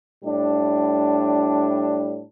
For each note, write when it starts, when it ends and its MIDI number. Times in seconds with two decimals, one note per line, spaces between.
0.23 2.21 45
0.23 2.21 55
0.23 2.21 62